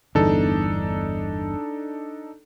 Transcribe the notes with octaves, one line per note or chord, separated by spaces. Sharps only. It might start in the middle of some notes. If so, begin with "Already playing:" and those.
G1 E2 A2 D4 D#4 A4